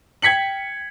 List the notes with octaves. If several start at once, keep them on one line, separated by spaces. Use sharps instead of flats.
G5 G#6 B6 C#7 F#7